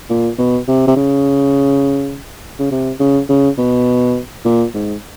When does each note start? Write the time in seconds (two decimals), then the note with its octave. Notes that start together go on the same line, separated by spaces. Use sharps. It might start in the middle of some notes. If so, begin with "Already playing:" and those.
0.10 A#2
0.39 B2
0.68 C3
0.87 C3
0.96 C#3
2.59 C#3
2.71 C3
3.00 C#3
3.29 C#3
3.58 B2
4.45 A#2
4.74 G#2